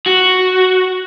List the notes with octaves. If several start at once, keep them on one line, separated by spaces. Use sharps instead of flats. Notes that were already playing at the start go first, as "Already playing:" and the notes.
F#4